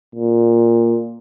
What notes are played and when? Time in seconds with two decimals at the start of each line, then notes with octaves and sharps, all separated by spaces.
0.15 A#2